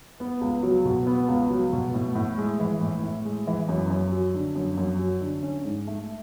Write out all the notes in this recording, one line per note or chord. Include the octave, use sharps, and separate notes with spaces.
B3
C#2
F#3
B2
B3
C#2
F#3
B2
A2
A2
G#3
E3
A2
A2
G#3
E3
F#2
F#2
F#3
D3
F#2
F#2
F#3
D3
C#4
G#2
A3